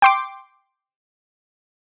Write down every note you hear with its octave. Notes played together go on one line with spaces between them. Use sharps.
G5 C6 D6